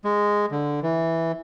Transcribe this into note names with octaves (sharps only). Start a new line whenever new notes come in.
G#3
D3
E3